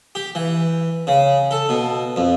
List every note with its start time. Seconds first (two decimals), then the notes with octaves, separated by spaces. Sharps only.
0.15 G4
0.35 E3
1.07 C#3
1.51 A4
1.69 B2
2.16 F2